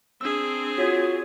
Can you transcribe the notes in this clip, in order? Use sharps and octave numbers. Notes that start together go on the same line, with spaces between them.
C4 D4 G#4 E6
F4 F#4 C#5